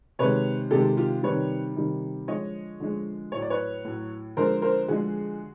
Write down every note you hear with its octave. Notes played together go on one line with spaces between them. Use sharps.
C3 D#3 G#3 B4 C#5
C3 D#3 G#3 G4 A4
F4 G4
C3 D#3 G3 B4 C#5
C3 D#3 G3
D3 F3 G#3 C#5 D#5
D3 F3 G#3
A2 F#3 C#5
D5
B4 C#5
A2 F#3
D3 F3 G#3 A#4 C5
A#4 C5
D3 F3 G#3 F#4 G#4